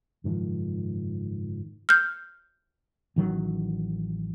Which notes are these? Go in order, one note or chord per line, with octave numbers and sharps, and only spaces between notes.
F#1 G#2 D#3 F3
F6 G6
A1 D#3 F#3